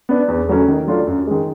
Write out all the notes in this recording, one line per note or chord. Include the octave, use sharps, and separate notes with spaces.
B3 D4
E2
C#3 F#3 A3 C#4
D#3
F#3 A3 D4 F4
F#2
D#3 G#3